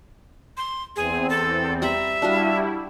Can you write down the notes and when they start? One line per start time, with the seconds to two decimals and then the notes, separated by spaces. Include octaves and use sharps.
0.57 C6
0.96 E2 C4 G#4
1.30 A4
1.82 G3 E5 A#5 B5
2.22 G3 D4 E4 F#4 F5